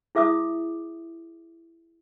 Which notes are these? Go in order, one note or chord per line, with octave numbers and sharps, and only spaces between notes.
E4 G#4 E5 D6 D#6